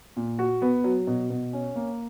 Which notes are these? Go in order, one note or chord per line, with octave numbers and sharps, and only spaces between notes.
A#2
F#4
B3
F#3
B2
B2
C#4
A#3